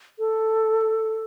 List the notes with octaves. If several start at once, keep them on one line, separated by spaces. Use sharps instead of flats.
A4